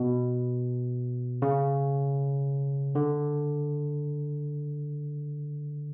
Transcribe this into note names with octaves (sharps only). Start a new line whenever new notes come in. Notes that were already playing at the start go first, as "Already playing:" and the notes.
Already playing: B2
C#3
D3